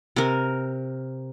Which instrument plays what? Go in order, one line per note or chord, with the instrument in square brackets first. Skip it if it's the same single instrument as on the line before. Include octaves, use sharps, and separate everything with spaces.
[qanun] C3 A#4